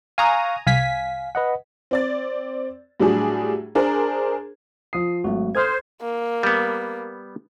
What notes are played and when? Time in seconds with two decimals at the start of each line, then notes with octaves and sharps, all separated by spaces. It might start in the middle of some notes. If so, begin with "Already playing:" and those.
0.18 F5 G#5 A#5 C#6 D#6 F#6
0.67 C2 F5 G#5 B6
1.35 B4 D#5 F#5
1.91 C4 D5 A6
3.00 A2 F#3 G3 D4 F#4 G#4
3.75 D4 G#4 A#4 C5
4.93 F3 D#6 C7
5.24 G#1 F#3 A3 F#4
5.55 A4 C5 D#6 F6 G#6
6.02 A#3
6.43 G3 B3